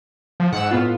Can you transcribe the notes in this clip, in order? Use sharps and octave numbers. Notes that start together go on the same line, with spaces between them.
F3
G#2 F#5 E6
A2 B3 F4